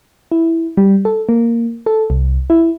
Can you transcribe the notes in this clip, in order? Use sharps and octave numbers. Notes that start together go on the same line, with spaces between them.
E4
G3
A4
A#3
A4
C2
E4